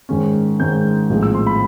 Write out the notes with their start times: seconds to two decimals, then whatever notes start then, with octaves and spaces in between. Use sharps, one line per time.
0.09 G#2 D#3 G#3 C#4
0.59 G#2 D#3 G#3 C#4 G6
1.10 A#1 A2 F3 G#3 C4
1.23 E6
1.35 C6
1.47 B5